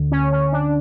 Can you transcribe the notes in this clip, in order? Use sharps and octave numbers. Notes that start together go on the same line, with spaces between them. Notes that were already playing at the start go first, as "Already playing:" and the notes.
Already playing: D2 D3
C#4
C#4
D4